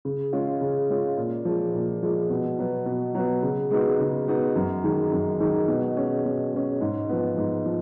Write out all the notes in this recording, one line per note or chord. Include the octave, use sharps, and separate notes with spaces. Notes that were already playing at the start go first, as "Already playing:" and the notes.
C#3
G#3 C#4 F4
C#3
G#3 C#4 F4
A#2
F3 G#3
A#2
F3 G#3
B2
F#3 B3
B2
F#3 B3
C#3
G#3 B3 D#4 F#4
C#3
G#3 B3 D#4 F#4
F#2
D#3 G#3 D#4
F#2
D#3 G#3 D#4
B2
G#3 C#4
B2
G#3 C#4
G#2
F3 B3
G#2
F3